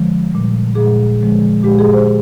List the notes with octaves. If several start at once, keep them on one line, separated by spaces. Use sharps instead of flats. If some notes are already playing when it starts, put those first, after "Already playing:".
Already playing: D3 F3 G#3
A#2 G3
A#2 G#3 G#4
D3 F3 G#3
A#2 G#3 G4
G#4
C5